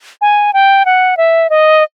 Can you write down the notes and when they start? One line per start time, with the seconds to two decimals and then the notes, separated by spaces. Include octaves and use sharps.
0.21 G#5
0.53 G5
0.85 F#5
1.17 E5
1.50 D#5